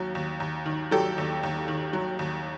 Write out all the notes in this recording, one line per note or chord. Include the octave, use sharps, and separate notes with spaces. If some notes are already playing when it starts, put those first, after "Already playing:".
Already playing: D#2 F#3
D#2
D#2
D#3
F#3 G4 A4
D#2
D#2
D#3
F#3
D#2